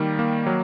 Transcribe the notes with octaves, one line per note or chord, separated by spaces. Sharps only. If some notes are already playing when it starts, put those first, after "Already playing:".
Already playing: D#3 G3 A#3
A#3
F#3